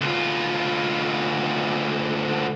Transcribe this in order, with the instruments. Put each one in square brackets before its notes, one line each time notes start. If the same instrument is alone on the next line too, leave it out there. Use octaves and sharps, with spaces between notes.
[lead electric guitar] D2 F4